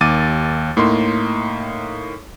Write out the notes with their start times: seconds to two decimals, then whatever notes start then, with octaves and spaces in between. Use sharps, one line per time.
0.01 D#2 D6 A6 D#7
0.77 A2 A#3 D#4 C6